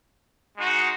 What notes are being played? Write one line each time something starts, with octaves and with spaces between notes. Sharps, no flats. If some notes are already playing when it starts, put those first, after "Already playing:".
G#3 D#4 F#4